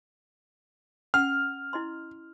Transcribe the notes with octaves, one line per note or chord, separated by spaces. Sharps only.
C#4 F#5 F6
E4 D#5 C6